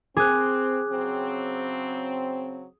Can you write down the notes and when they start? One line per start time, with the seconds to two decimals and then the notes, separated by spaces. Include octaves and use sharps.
0.17 C4 G#4 D6 F#6
0.90 C#3 F#3 C4